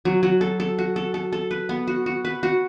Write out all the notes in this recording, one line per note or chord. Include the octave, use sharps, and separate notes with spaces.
F#3
F#3
A4
A4
F#4
A4
A4
A4
B4
B3
F#4
F#4
B4
F#4